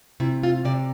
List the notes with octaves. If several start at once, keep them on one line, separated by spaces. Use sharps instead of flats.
C3 E4
F4
C3 D5